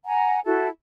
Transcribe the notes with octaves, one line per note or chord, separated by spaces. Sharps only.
F#5 G#5 A#5
E4 F#4 A4